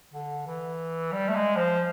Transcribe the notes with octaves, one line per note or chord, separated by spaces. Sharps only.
D3
E3
G3
A3
G#3
F3